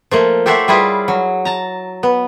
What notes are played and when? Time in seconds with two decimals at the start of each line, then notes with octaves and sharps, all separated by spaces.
0.11 F3 A3 A#3
0.46 G4 A4 C5 C#5 E5 F#5
0.68 G3 E4 F4 G#4 B4
1.08 F#3
1.45 A5 A#5
2.03 B3